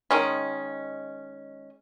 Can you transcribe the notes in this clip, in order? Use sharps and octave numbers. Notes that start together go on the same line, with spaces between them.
D#3 G#3 C#4